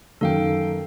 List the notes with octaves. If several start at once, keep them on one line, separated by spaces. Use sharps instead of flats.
F#2 D#3 A4 F5 G5